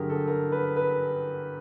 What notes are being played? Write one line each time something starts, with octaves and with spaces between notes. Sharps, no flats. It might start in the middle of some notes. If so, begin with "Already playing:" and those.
Already playing: G2 D3 F#3 G4 G#4 A#4
A4
A#4
B4
B4